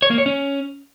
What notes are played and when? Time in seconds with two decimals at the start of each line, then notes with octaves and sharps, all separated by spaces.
0.02 C#5
0.10 A#3
0.18 C#5
0.26 C#4